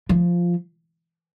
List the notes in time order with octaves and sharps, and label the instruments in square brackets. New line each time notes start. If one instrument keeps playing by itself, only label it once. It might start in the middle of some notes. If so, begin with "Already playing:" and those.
[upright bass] F3